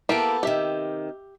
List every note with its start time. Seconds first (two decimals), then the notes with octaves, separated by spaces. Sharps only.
0.09 A#3 B3 E4 G4 A4
0.43 C3 D#3 G4 E5